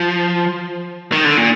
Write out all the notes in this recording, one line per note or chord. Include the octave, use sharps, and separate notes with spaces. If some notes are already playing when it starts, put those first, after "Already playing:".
Already playing: F3
D#3
D3
A#2